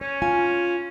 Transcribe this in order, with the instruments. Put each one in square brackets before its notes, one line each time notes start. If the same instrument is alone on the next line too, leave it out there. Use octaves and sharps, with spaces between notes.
[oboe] C#4 [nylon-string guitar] C#5
[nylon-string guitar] F4 G#5